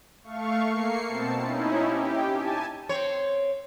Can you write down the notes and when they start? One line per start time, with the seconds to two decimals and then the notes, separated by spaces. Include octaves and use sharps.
0.24 A3 F5 C#6
0.65 A#3 C7 C#7
1.07 B2 C4 A5
1.38 C#4 D#4 E4
1.86 G4
2.30 G#5 A5
2.89 C4 C#5